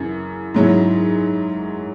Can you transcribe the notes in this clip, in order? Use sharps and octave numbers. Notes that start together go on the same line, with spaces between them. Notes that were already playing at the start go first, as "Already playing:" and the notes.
Already playing: F#2 C#3 E3
G#2 F#3 C#4 E4